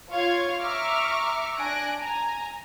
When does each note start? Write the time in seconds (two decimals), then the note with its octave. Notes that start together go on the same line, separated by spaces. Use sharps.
0.11 F4 C#5 F5 C#6 G#6
0.61 E5 A#5 C#6 D6 F6
1.56 D4 G#5 F#6 A#6 D7
1.97 G#5 A#5